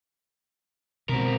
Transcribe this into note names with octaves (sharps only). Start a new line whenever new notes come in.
B2 C4 A#4